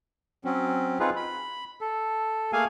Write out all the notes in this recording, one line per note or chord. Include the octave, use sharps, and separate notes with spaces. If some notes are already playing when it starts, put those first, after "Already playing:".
F#3 C4 C#4
C4 D#4 F4 G#4 B4
B5
A4
A3 A#3 G#4 F5 G#5